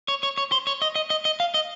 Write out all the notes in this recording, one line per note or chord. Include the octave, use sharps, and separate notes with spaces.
C#5
C#5
C#5
C5
C#5
D#5
D#5
D#5
D#5
F5
D#5